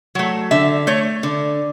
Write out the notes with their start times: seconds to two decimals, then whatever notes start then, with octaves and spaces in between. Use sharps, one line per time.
0.15 F#3 A3
0.51 D3 E5
0.87 A3 C#5
1.23 D3